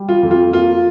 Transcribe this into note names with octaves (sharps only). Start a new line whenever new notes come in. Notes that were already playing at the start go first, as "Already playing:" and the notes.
Already playing: G3
F4
F2
F4
A#3 F4